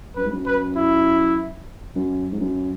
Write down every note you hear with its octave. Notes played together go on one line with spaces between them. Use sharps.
F#2 B4
G#2
F#2
B4
E4
F#2
G#2
F#2